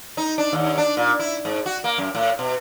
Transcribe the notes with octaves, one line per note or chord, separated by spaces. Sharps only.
D#4
D4
D#2
D4
A#2
E4
G#2
F#4
A#3
F#2
A2
B2